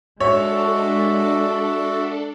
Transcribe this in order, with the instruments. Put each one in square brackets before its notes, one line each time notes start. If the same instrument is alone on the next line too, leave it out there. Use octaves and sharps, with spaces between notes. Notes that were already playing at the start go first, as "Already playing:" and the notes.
[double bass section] G#3 [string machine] D4 A4 [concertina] F#4 E5 [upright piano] C#5